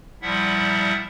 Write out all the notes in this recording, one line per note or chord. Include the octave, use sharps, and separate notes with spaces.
A#2 F3 G3 E4 E5 F#5